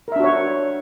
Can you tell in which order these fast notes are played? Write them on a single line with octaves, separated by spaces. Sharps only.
A#4 E5 D4 F#4 C#5